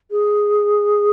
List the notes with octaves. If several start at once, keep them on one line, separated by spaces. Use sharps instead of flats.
G#4